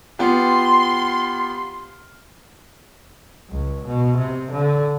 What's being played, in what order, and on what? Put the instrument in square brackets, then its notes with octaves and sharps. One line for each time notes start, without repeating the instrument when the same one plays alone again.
[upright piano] B3 F4 G4 [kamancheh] C6
[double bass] C#2
B2
C3
D3